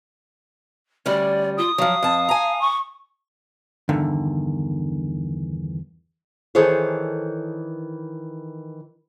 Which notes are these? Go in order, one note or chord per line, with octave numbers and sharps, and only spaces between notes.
D2 G3 C#4 D5
F4 D#6
F3 F#3 F5
F2 A5
G#5 A#5
C#6
E2 G2 D3 D#3
D#3 E3 G#4 A4 C5 C#5